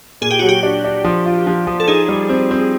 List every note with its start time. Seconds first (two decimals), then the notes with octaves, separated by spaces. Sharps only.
0.21 A#2 G#4
0.31 G4
0.39 F#3 F#4
0.49 G4
0.63 D4
0.84 D4
1.04 F3
1.25 F4
1.47 F3
1.67 F3
1.80 A4
1.88 D#4 G#4
2.09 G3
2.29 C4
2.51 C4